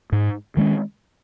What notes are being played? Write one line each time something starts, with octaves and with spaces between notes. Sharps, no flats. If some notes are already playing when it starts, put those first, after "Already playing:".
G#2
D#3 G#3 C#4